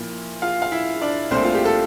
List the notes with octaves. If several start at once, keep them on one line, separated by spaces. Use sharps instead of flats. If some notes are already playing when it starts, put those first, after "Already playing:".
Already playing: A#2 F3 A#3 E4
F4 F5
F5
E4 E5
D4 D5
C2 A#2 A3 C4 D4 C5
F4
G4
A4